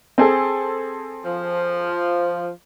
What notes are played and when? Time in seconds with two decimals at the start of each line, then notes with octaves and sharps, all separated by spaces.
0.18 C4 G#4 A4
1.25 F3